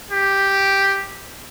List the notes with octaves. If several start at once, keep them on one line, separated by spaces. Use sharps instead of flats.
G4